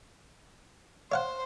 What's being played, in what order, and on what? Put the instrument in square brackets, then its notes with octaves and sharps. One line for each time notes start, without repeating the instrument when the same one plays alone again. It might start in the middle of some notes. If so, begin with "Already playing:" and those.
[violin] C5 [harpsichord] C#5 F5 F#5